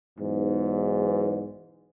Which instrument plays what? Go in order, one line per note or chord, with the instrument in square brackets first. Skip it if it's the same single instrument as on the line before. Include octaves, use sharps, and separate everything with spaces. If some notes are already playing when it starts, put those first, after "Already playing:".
[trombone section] B1 E2 G#2